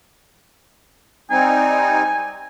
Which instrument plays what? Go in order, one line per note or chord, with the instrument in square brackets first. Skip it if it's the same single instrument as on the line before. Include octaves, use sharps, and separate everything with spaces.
[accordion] G3 C4 D#4 [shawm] G#5